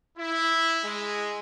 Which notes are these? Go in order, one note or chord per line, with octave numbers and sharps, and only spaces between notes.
E4
G#3